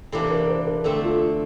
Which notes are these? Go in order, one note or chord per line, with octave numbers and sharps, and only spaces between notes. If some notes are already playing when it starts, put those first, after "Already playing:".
C3 E3 A#3 D4 A4
A#4
C5
A#4
D3 A3 C4 A4
F4